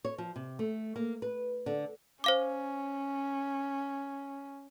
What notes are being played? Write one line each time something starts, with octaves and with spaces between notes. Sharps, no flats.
C#5
F3
C3
A3
A#3
B4
D3
C#4 C5 F5 D6